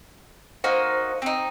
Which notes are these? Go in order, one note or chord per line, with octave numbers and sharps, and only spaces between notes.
A#3 D#4 F#4 C5
C4 D#4